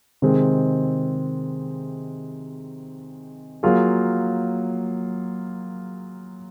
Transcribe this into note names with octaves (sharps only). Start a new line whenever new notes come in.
C3 D#3 G#3 C4
F#3 A#3 F4 G#4